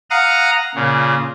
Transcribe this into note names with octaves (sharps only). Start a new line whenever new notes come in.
F5 F#5 A#5 D#6 F6
A#2 C#3